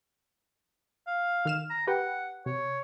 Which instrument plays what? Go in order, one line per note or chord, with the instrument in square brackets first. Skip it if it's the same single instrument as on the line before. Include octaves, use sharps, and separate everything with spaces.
[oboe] F5
[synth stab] D#3 F6 E7
[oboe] A#5
[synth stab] G4 B4 G5 [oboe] F#5
[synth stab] C3 [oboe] C#5